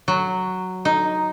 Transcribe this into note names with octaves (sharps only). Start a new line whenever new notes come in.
F#3
D#4